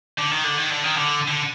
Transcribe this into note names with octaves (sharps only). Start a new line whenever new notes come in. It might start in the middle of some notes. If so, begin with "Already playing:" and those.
D3
D#3
D3
D#3
D3
D#3
D3
D3